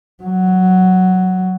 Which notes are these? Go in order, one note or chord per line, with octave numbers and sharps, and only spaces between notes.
F#3